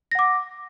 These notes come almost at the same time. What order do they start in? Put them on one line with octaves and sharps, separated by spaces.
A#6 F#5 D6